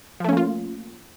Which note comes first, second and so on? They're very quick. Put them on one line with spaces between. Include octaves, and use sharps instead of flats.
F3 A3 C#4 A#3 F4